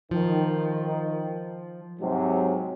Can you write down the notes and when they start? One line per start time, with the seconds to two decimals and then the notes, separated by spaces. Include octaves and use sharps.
0.11 D#3 F3
2.00 G#2 C3 F#3